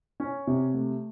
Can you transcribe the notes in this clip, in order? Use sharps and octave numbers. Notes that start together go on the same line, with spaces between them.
C#4
C3
A3